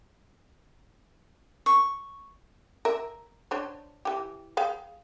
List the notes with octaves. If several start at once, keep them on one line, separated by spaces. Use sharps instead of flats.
C#6
A#4 E5
D4 C5 C#5
E3 G4
G#4 F5 G5